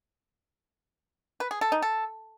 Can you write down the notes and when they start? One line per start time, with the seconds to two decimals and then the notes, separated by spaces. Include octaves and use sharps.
1.40 B4
1.51 G#4
1.61 A4
1.72 D#4
1.82 A4